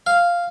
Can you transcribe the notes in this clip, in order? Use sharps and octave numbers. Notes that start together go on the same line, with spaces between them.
F5